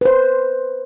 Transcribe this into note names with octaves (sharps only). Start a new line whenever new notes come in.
B4 C5